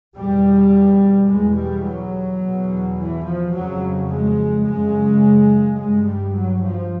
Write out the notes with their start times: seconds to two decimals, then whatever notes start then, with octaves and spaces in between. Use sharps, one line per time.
0.17 E2 B2 G3
1.30 E2 B2 G#3
1.57 G3
1.85 F#3
2.42 E2 B2
2.98 E3
3.25 F3
3.53 F2 C#3 F#3
4.10 G#3
4.66 F#2 C#3 G#3
5.77 G2 G#3
6.06 G3
6.33 F#3
6.61 F3